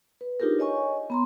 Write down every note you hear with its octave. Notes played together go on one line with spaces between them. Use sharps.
B4
D4 D#4 F4 G4 G#4 A#4
C#5 D#5 G#5 C#6
B3 A#5 C6